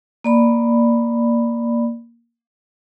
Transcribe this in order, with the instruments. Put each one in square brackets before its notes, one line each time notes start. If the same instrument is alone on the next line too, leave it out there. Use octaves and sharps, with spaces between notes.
[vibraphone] A#3 D5 B5